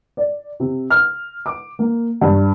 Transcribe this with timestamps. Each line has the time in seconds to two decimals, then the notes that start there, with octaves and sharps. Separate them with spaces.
0.17 D5
0.60 C3
0.90 F6
1.46 D6
1.79 A#3
2.21 G2